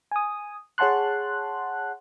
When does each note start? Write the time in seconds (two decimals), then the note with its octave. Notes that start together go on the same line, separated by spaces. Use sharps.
0.11 G#5 D#6
0.78 G#4 C#5 F#5 A5 C6 F#6